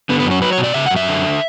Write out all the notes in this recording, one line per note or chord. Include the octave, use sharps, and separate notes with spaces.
D3 B3
B3
F#2
C#4
F#3 B4
C#5
B2
D5
C#3 E5
F#2 F#5
E5
D3